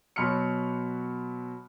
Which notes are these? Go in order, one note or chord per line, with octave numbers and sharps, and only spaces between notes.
B2 F#3 B5 C6 F6 C#7